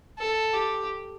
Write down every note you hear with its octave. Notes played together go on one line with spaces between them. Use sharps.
A4
G4